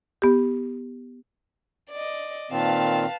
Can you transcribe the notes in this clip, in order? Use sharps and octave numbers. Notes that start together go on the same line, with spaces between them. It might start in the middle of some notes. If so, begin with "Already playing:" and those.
B3 G4
D5 D#5
A#2 D#3 C4 B4 F5 A5